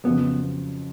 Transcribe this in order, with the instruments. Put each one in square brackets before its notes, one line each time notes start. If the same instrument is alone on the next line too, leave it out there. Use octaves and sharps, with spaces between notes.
[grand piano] F2 C#3 F#3 [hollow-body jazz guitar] B3